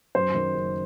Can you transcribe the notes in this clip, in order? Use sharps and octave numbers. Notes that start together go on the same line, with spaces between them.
F#2 C5
D#3
F#1